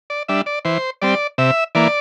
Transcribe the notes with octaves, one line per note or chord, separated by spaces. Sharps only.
D5
G3 D4 E5
D5
E3 C5
G3 C4 D5
C3 E5
E3 A#3 D5